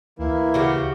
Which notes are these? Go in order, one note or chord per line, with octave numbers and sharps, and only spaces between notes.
D2 E3 A#3 E4
C#3 F#4 G4